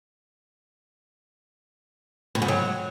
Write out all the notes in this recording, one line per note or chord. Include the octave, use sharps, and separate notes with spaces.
A2
G#2
F#3